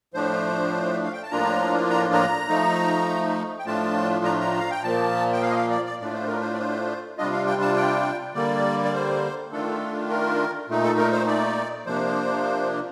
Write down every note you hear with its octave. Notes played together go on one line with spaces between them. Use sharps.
A2 F3 A3 D4 C5
F5
G5
A5
A2 F3 A#3 D4 F4 A#5
A#5
A#5
F3 A3 D#4
G5
A2 F3 A3 D4 F4 A5
A#5
A#5
F5
G5
A#2 F3 A#3 A5
G5
F5
D#5
F5
D5
D5
A2 A3 D4 F4 D5
C5
A#4
C5
D5
C5
C3 G3 D4 F4 D#5
F5
G5
A5
G5
D3 G3 A#3 D5
D5
C5
D#3 A3 D4 F4 A4
A#4
A#2 A3 D#4
A4
A#4
C5
D5
C3 F3 A#3 D4 C5